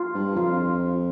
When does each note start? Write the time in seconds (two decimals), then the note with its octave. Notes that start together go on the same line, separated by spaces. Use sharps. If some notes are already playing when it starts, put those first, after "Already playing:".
Already playing: F4
0.14 G2
0.36 F2 F4